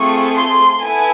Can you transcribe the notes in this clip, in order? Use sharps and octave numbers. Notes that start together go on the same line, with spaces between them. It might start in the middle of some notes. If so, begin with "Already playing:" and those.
Already playing: A3 C4 F4 G#4 C#6
C6
B3 E4 A4 G#5